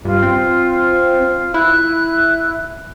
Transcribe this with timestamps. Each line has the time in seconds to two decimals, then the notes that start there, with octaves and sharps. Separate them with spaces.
0.05 G2 F4
0.23 C4
1.54 E4 F#6